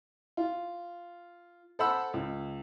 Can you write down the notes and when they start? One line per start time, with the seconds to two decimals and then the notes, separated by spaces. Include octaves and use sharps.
0.37 F4
1.79 A4 C5 F#5 B5 E6
2.14 C#2